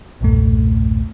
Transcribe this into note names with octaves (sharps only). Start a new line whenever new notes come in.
B1 E2 G2 A#2 A3